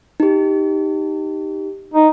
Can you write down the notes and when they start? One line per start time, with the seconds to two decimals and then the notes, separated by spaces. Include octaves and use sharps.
0.20 D#4 G4
1.94 D#4